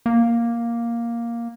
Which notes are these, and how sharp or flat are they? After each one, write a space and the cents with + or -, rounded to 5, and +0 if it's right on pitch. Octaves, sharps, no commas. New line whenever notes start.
A#3 +5